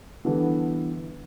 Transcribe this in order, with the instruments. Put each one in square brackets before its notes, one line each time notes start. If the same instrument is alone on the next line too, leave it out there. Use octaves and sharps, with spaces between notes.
[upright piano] D3 E3 G3 B3 A4